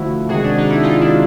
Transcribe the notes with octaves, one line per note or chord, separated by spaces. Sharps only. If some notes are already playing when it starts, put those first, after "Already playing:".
Already playing: D3 F3 A3 E4 F#4
C3 D#3 G#3 F#4 G#4
D4
D#4
E4
D#4 F4
D4 E4